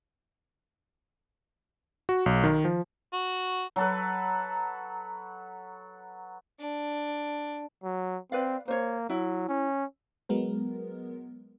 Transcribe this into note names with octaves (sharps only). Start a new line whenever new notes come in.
F#4
B1
D#3
F3
F#4
F#3 A4 B4
D4
F#3
C4 B4 D5 F5
A#3 C5 C#5
F#3 E4
C#4
F#3 G#3 B3 A#4